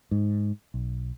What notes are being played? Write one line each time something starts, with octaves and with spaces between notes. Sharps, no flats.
G#2
B1